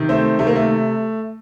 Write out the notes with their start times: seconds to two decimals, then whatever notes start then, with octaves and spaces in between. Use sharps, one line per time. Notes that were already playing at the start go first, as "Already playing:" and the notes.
Already playing: C3 D#3
0.09 A3 C4
0.39 C3 A3
0.47 A#3
0.56 A3